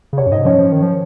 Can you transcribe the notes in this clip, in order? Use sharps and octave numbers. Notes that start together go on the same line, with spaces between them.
C#3
C3 C#5
F#2
G#2 D#5
F3 C#4 C#5
F3
D#3
F3